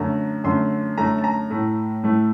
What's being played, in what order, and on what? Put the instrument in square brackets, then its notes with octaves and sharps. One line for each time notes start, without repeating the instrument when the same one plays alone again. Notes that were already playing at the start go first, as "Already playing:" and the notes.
Already playing: [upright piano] F#2 D3 A3 A#5
F#2 D3 A3 C6
F#2 D3 A3 A#5
A5
A#5
A2 A3
A2 A3